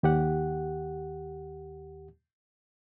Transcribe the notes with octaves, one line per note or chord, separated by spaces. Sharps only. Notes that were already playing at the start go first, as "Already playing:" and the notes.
D#2 G4 F#5